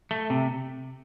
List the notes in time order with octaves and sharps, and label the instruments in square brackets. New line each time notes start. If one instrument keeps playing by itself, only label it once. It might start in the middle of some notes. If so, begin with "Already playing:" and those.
[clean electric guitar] A3
C3